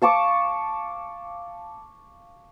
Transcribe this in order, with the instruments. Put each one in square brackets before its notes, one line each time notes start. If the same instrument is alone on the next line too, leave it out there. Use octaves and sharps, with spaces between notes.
[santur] F5 A5 C#6 D6